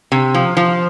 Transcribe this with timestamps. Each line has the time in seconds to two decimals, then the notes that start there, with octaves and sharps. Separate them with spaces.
0.12 C3
0.34 F3
0.57 F3